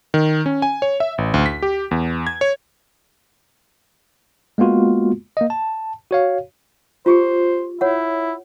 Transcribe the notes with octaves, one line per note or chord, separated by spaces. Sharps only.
D#3
C#4
G#5
C#5
E5
A1
D2
B6
G4
E2
G#6
C#5
G#3 A#3 B3 F4 F#4
A#3 D#5
A5
F#4 C#5 F5
F4 G4 G#4 C5
E4 C#5 F#5